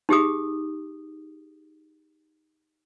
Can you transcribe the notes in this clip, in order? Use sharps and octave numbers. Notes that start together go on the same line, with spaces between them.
D#4 G4 G#4 D#6